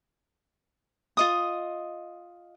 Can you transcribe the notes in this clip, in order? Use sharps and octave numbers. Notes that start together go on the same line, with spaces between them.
F4 D#5 D#6